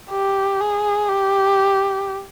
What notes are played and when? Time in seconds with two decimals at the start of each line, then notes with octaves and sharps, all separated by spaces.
0.11 G4
0.61 G#4
1.09 G4